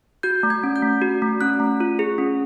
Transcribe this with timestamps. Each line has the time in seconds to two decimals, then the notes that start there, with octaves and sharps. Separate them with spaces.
0.23 F#4 G6
0.43 A3
0.50 G#6
0.63 C#4
0.76 G6
0.83 A3
1.02 F#4
1.22 A3
1.41 C#4 F#6
1.60 A3
1.80 F4
1.99 G#4
2.18 C#4